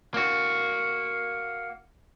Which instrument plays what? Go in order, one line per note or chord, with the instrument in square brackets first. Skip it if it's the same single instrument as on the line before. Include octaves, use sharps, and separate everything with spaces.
[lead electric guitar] A#3 F#4